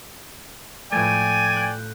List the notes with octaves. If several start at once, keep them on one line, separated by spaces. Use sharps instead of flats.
A2 F3 A3 D5 G5 G#5
F#6 G6